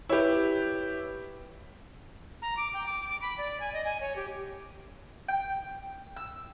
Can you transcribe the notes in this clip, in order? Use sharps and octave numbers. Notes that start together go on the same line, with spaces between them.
E4 G4 B4 C#5
A#5
D6
G5
D6
D6
B5
D5
G#5
D#5
G#5
C#5
G4
G5
E6